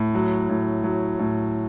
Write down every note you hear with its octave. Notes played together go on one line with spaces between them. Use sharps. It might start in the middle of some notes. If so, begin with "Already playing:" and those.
Already playing: A2
F#3
A2
F#3
A2